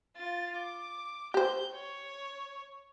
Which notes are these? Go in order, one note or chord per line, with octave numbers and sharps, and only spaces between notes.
F4 A6
D6
G4 C5 G6
C#5